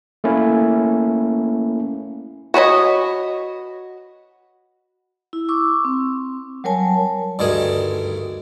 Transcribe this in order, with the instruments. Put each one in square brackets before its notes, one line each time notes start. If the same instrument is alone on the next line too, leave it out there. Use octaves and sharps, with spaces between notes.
[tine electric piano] A3 A#3 C#4 E4
[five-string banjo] F#4 B4 C#5 D#5
[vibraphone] E4
C#6 D6 E6
C4
F#3 G3 A#4 C#5 G#5 A5
[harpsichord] D2 G2 D#3 G#4